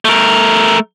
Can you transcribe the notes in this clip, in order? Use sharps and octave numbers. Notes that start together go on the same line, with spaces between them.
A3 A#4